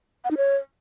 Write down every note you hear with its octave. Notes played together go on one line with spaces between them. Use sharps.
F#5
D#4
C#5